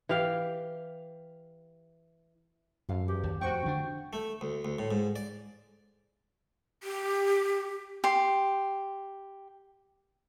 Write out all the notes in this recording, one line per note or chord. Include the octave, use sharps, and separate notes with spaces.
E3 G4 F5 G5
F#2 A4 F5
E2 G4
D#2
F2 A2 F#4 C5 G5 C#6
D3 D4
A3
D2
D2
A2
G#2
D5
G4
G4 C6